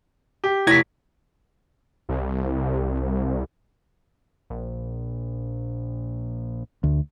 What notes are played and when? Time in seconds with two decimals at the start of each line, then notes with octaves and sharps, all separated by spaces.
0.44 G4
0.67 F1 E4 G#6 A#6 B6
2.09 C2
4.50 A#1
6.84 D2